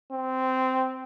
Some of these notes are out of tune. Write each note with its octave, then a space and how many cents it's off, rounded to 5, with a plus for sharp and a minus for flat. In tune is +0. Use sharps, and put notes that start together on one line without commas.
C4 -10